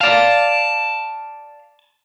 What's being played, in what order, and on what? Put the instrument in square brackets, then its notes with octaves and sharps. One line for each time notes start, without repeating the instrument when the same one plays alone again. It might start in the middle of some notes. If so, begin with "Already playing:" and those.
[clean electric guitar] D5 F5 [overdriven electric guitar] A5